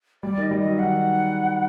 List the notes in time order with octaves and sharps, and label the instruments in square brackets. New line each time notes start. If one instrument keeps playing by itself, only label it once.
[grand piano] G3 [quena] D5
[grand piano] D#3 [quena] D#5
[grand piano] G3
[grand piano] F#3 [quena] D#5
[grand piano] D#3 [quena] F#5